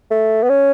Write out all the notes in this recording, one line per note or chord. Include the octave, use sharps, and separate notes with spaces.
A3
B3
C#4